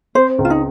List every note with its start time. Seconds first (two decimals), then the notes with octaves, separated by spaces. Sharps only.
0.15 C4 C5
0.38 C#2
0.45 F4
0.50 D#4